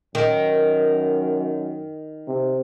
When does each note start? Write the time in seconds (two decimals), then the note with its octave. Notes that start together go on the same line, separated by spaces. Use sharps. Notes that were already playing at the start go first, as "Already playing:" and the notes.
0.15 F#2 D#3
2.28 C3